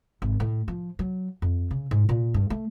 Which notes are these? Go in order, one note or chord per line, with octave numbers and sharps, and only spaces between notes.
G#1
A2
F3
F#3
F2
C#3
G#2
A#2
G2
A3